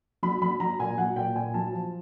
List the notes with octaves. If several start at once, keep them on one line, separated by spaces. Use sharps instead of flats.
F#3 B5
F#3 B5
F#3 A#5
A#2 G#5
F#3 F#5
A#2 G5
A#2 G#5
F#3 A5
F3